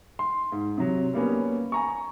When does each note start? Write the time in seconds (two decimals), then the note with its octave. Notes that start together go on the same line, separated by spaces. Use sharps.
0.19 C6
0.52 G#2
0.78 C3 F#3
1.14 G3 A#3 B3 C#4
1.72 G#5 A#5 C#6